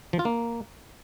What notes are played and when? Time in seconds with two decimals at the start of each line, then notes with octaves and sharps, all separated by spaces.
0.13 F3
0.19 F4
0.25 A#3